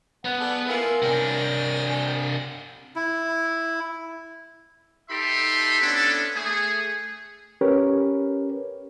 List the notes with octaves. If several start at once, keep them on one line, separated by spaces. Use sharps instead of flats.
B3 F#5
G#4 A4 D5
E4 F4 A#4 G#5
C3 D4 G5 G#5
E4
D#4 G4 A4 E5 B5 C6
B3 C#4 D4 E4 A4
A3 G#4
C#4 G4 A#4 B4 C#5